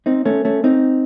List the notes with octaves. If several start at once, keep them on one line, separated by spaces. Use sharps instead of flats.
C4 D#4
A3 C#4
A3 C#4
C4 D#4